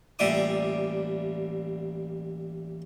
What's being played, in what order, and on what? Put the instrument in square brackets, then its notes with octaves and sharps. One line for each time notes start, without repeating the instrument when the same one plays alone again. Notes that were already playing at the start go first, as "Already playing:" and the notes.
[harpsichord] A1 A#2 G3 E5 D6 D#6